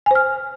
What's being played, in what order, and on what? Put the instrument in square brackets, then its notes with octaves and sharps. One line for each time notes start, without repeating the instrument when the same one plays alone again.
[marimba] G#5
C5
F6